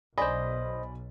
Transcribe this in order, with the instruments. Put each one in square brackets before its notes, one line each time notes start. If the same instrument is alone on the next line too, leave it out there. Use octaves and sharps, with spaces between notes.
[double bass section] B1 [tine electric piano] C5 D#5 [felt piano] D5 G#5 B5